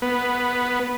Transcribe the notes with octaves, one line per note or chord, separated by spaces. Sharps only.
B3